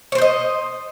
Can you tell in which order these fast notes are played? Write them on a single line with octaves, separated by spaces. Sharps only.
C#5 C5 G5 D#5